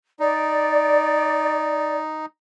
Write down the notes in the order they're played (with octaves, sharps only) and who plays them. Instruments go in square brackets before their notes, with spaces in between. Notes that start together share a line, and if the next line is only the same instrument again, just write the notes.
[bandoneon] D#4 [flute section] D5